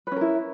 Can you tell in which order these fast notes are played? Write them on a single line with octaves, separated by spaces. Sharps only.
B4 C#4 A#4 E4